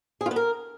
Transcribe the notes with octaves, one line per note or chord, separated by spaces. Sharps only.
G#4
F4
B3
A#4